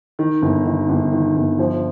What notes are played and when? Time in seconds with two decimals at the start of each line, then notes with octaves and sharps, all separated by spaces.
0.19 D#3
0.42 G1
0.66 D#3
0.89 G1
1.12 D#3
1.35 G1
1.59 F3